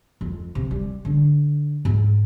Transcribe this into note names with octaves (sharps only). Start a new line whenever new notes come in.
F2
C3
G3
D3
G#2